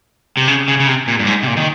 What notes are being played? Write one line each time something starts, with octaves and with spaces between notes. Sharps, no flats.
C3
C#3
C#3
C#3
C3
A#2
G2
G#2
C3
A#2
D#3